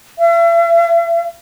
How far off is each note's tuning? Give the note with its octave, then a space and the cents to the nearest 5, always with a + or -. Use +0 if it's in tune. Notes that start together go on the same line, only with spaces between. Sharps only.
E5 +40